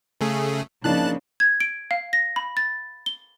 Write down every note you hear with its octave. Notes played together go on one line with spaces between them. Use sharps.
C#3 A3 G#4
C#3 F3 A#3 D4 D#4 A5 F#6
G#6
D7
F5
A#6
B5
A6
G7